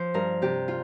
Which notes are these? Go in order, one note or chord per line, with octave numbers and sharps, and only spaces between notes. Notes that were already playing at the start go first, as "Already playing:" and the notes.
Already playing: F3 C5
G2 A#4
C3 G4
F4